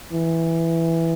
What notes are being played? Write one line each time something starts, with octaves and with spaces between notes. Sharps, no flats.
E3